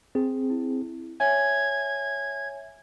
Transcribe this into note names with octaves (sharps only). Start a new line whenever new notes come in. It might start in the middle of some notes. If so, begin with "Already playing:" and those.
C4 G#4
E4
C#5 E5 G#5 G#6